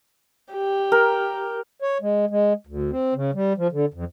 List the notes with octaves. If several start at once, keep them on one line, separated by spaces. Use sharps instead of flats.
G4
A#4
C#5
G#3
G#3
D2
C4
C#3
G3
F3
D3
F2